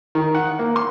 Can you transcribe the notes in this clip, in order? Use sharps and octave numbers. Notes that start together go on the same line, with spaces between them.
D#3
F#5
A#3
C6